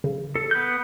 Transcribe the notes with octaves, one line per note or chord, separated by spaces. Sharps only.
C#3
A4
B3 F#6 G6